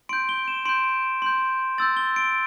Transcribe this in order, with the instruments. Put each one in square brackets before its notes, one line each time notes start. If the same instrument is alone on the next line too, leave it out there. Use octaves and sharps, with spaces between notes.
[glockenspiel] C6 G6 D7
G7
E7
C6 G6 D7
C6 G6
C6 E6 G6 A6
G7
D7